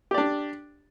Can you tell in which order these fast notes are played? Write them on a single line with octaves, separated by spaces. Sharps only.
G4 D5 D4